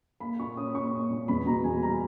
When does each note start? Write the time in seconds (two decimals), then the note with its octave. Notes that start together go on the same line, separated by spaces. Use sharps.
0.20 A#3 B5
0.40 A#2 C#6
0.57 C#4 D#6
0.75 A#2 C#6
0.93 A#2
1.10 A#2
1.28 E2 B5
1.46 B2 A#5
1.64 E2 G#5
1.83 G3 A#5